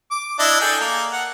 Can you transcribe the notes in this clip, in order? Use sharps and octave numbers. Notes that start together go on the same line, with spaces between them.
D6
D4 E4 D#5
G#4 A4 G5
A#3
F#5